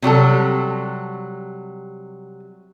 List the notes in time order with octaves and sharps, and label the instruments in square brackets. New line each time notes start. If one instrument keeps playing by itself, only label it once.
[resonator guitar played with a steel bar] C3 F#3 G3 A4